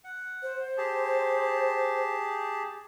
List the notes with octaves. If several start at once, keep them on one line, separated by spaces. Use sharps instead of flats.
F#5
C5
G4 G#4 A5